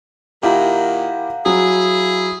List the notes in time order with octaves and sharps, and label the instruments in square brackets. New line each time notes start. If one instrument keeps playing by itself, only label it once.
[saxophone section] A#2 D#3 [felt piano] E4 G4 [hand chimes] F5 F#5 A#5
[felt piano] F#3 [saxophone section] E4 G#4